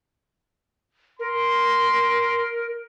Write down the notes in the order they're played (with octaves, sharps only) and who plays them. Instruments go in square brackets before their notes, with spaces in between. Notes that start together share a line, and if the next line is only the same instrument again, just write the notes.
[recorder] A#4 [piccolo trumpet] C6